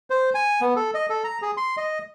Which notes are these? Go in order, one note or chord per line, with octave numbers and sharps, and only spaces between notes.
C5
G#5
B3
A4
D#5
A4
A#5
G#4
C6
D#5